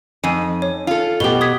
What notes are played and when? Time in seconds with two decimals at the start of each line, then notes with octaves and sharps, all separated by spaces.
0.24 F2 D#4 G#5 D#7
0.62 C#5
0.87 F4 A4
1.20 B2 B3 G4 G7
1.41 D#6 G#6 B6